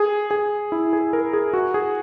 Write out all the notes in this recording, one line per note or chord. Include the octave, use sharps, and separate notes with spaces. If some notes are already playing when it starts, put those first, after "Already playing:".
Already playing: G#4
G#4
E4
G#4
A#4
G#4
F#4
G#4